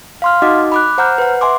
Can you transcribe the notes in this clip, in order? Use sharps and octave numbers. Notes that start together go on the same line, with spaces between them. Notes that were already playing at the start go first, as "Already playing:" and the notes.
F5 C6 F6
D#4 F#4 D#5 F#5 D6
B5 D6 F#6
C5 F#5 A#5 F6 G6
B4 F#5
E5 G#5 C6 D6